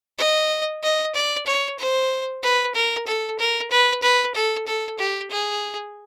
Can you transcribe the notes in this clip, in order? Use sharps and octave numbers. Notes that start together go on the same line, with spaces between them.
D#5
D#5
D5
C#5
C5
B4
A#4
A4
A#4
B4
B4
A4
A4
G4
G#4